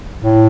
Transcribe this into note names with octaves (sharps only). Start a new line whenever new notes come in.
A2